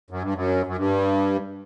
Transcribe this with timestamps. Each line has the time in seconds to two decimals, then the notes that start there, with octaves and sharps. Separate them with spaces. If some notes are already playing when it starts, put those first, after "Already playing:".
0.11 F#2
0.22 G2
0.34 F#2
0.66 F#2
0.77 G2